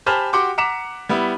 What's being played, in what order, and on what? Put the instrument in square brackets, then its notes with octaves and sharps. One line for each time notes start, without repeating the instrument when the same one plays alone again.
[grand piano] G4 C5 G#5 A5 B5 F6
F#4 G4 F#5 G5 C6 D6
F#5 A#5 D6 B6 C#7 E7
G3 B3 E4